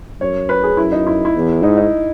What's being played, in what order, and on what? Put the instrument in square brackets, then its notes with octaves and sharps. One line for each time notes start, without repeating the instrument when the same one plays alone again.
[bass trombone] F#2 [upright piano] C#5
[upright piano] B4
G#4
[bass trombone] F#2 [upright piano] E4
[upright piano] D#4
E4
E4
[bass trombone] E2
[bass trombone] G#2 [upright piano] D#4
[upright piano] D#4